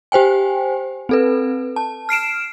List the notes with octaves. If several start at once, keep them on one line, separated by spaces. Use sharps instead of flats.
G4 C5 G5 G#5
C4 A4 B4
A5
F6 C7 D7 E7